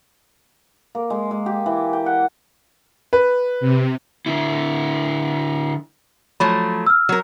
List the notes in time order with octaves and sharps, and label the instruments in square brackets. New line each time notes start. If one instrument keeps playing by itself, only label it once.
[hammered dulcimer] A#3
G#3
G#3
G4
E3
G5
F#5
[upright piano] B4
[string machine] C3
[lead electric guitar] D3 E4
[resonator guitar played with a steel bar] F3 F#3 A3 [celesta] B5
[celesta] E6 F6
[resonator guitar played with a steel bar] F#3 A#4